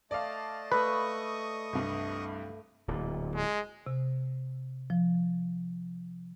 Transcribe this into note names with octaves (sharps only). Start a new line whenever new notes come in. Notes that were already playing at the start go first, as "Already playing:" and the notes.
A3 D5 D#5 F5 A5
A3 B4 D#5 B5 C#6 D#6
C2 G2
D1 A#2
G#3
C3
F3